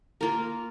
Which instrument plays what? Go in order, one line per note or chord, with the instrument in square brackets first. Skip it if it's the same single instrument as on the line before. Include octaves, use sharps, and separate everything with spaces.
[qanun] A#3 F4 A#4